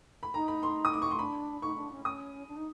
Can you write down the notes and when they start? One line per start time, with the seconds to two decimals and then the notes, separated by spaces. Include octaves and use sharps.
0.23 B5
0.34 D#4 A#5
0.48 B5
0.63 C6
0.85 D#6
0.93 D6
1.02 C#6
1.11 C6
1.19 D4 B5
1.62 D#4 C#6
1.76 D4
1.91 C#4
2.05 C#4 D#6
2.48 D4
2.56 D#4